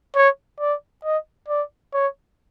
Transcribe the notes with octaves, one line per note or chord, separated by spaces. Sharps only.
C#5
D5
D#5
D5
C#5